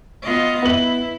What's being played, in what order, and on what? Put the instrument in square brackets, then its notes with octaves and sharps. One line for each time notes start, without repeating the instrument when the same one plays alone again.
[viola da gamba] B3 F4 D#5
[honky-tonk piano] B3 F#7 [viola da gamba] E4